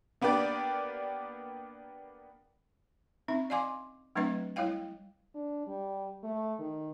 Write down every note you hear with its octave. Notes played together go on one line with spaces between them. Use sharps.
A#3 B3 D4 G4 D5
C4 C#4 D#4 E5
D5 D#5 F5 G#5 C6 D6
F#3 A3 C4 D4 B4 D#5
G3 E4 C#5 D#5 F5 G5
D4
G3
A3
D#3